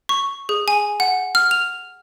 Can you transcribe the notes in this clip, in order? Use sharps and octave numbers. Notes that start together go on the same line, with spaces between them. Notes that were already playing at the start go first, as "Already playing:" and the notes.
C#6
G#4
G#5
F#5
F6
F7